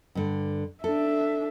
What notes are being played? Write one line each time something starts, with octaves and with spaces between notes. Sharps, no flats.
G2 D3
D4 A4 E5